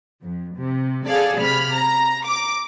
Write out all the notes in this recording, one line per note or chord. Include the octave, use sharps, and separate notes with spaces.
F2
C3
G#4 A4 D5 F5
C3 B5 F6
A#5
D6